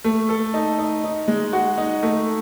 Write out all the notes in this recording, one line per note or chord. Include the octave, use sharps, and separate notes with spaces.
A3
A4
D#4
D#4
D#4
G#3
F#4
D#4
A3